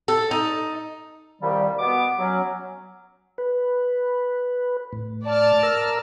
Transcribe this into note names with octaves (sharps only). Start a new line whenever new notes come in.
A4
D#4
C2 A#2 D#3 G3
B2 B3 D6
F#3 C#4
B4
A2
D5 A5 F6
A#4 A#5 E6